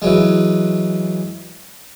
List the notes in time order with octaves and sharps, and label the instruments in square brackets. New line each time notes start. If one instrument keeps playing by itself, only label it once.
[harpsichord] E3 F#3 G#3